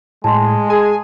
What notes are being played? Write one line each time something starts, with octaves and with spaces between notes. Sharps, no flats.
A2 G#3 A5 C6
G#4 G#5